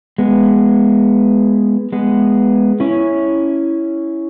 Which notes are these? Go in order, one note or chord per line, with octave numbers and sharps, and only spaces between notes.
G#3 B3
G#3 B3
C#4 E4